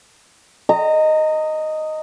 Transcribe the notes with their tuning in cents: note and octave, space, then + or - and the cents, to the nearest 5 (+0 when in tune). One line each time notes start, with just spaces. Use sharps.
D#5 +0 A#5 -30